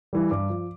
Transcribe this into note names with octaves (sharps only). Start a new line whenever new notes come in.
E3 G3
G2 D6
F3